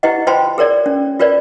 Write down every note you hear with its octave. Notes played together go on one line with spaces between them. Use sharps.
E4 G4 B4 D#5 F#5
F4 B4 C5 G5 A5 C6
G#4 A#4 C#5 D5
C#4
F4 A#4 B4 C#5 D5